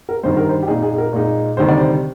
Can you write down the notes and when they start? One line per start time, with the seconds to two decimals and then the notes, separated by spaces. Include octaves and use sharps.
0.09 A#4
0.23 G2 D#3 G3 C5
0.37 A#4
0.49 C5
0.63 G4
0.68 A#2 G#3 D#4 G#4
0.82 G#4
0.93 G#4
0.98 A#4
1.13 A#2 G#3 D#4
1.57 D2 C3 D#3 G3 C5
1.69 D5
1.80 C5